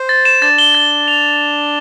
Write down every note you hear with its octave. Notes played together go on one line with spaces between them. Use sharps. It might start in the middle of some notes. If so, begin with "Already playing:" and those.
Already playing: C5
A6
E7
D4 A6
G7
A6
G7
F7